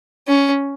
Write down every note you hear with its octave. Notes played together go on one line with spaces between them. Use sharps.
C#4